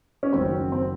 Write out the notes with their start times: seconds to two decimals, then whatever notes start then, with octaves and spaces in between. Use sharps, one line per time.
0.23 C#4
0.33 F#1 F#2 D#3 F#3 C4
0.72 C4